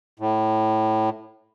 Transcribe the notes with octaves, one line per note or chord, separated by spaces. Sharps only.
A2